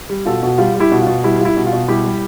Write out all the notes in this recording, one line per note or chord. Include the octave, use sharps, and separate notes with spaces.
G3
B2 F4 A4
B2
G3 F4
G3
E4 G4
B2
F4
B2
G3 E4
G3 F4
E4
B2
F4
B2
G3 E4 G4
G3